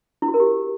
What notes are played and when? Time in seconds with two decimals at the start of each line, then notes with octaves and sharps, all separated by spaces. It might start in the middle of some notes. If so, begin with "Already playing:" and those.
0.22 E4
0.28 F#4
0.34 A#4
0.40 G4